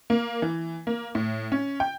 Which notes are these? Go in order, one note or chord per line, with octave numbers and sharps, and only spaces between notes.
A#3
E3
A#3
A2
C#4
G5